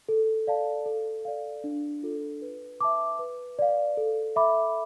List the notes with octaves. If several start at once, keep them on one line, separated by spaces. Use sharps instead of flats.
A4
D5 F5 A5
A4
D5 F5
D4
F4 A4
B4
E5 A5 D6
B4
D5 F5
A4
E5 B5 D6